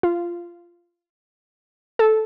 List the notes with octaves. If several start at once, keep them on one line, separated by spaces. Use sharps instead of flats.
F4
A4